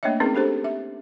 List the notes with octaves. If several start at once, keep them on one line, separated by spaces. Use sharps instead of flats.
A3 A#3 D4 C#5 D#5 E5
C4 C#4 D#4 G#4 A#4 B4
D4 G4 A4 C5
E5